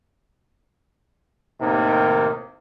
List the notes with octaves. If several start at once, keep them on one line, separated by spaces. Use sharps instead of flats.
D#2 A2 C3 D#3 A#3